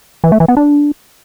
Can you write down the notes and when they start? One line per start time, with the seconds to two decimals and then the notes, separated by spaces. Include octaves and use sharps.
0.24 E3
0.32 A3
0.40 E3
0.48 B3
0.57 D4